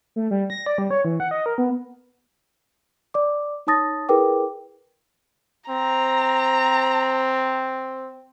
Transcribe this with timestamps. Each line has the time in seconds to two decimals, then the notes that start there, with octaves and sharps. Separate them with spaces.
0.16 A3
0.31 G3
0.50 A#6
0.66 D5
0.78 G3
0.90 C#5
1.05 E3
1.20 F#5
1.31 D#5
1.46 A#4
1.58 B3
3.14 D5 D6
3.67 D#4 C#5 A5 D#6 A6 A#6
4.09 E4 G#4 A#4 B4 G5 D6
5.70 C4 A#5